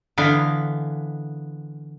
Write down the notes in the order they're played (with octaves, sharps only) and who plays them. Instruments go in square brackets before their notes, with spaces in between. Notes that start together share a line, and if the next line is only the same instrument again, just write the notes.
[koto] D3 E3 B3 F5